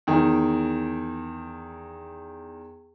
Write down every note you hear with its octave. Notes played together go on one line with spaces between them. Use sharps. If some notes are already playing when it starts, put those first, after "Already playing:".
E2 D#3